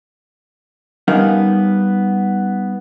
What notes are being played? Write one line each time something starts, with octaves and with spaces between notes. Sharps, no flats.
G3 B3 C#4 D#4 A#4 F5